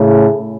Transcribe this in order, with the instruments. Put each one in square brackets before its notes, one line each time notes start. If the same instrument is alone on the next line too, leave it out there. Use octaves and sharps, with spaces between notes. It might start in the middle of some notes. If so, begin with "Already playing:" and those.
Already playing: [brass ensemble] A2 C#3